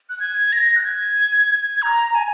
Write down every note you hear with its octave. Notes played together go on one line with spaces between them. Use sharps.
F#6
G#6
A#6
F#6
G#6
G#6
A#5
G#5